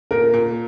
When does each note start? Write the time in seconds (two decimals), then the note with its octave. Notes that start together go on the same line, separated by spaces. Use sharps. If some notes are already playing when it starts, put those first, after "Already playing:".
0.11 A#2 A#4
0.33 A#2